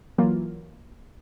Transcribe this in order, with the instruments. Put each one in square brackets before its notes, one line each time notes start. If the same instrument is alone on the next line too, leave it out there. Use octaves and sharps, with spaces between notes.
[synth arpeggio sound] E3 F#3 A#3 F4